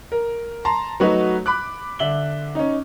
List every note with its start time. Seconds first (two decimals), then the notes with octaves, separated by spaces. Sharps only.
0.12 A#4
0.65 A5 A#5 C6
1.00 F#3 A3 D#4 F#4 B4
1.46 B5 D6 F#6
1.99 D3 E5 F#7 G7
2.55 C#4 D#4